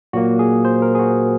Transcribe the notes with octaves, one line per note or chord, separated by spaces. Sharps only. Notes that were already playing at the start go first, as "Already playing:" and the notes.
A#2 F#3 A#3 F#4
G#4
C5
A#4
G#4
F#4